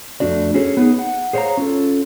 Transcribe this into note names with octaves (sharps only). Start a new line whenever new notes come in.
F2 A3 D4 F#4 D5
C#4 F#4 G#4 A4 C#5
B3 D#4 G#4
F#5
G#4 C5 C#5 E5 F5 A#5
C#4 F4 A4